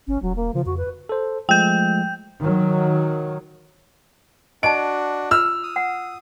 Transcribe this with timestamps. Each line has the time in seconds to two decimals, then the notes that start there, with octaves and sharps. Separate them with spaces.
0.08 G1 C#4
0.22 E1 F#3
0.36 A#3
0.54 C#3 F3
0.66 F2 F#4
0.77 B4
1.09 A4 C5
1.49 F3 G#3 A3 G5 G6
2.41 D#3 F#3
4.63 D4 F#4 D#5 A5 D7
5.31 F4 E6 F6
5.63 D#6
5.76 F#5